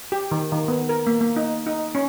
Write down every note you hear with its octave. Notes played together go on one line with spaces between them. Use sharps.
G4
D#3
D#3
B3
A#4
A#3
A#3
D#4
D#4
C#4